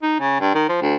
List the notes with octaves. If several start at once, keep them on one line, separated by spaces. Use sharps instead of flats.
D#4
C#3
G2
D#3
F3
D2